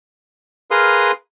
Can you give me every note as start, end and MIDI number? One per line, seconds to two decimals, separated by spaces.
0.71 1.12 68
0.71 1.12 70
0.71 1.12 71
0.71 1.12 77
0.71 1.12 84
0.71 1.12 87